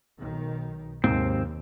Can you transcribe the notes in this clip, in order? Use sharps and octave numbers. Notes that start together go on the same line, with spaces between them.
B1 D#3
D#2 G#2 C3 A#3 C4